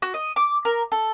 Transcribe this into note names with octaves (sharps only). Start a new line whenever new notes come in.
F#4
D#5
D6
A#4
A4